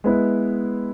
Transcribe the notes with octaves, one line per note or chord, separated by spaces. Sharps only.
G#3 B3 E4 B4